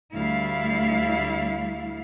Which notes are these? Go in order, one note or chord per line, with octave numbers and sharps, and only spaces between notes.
D2 G3 E4 F5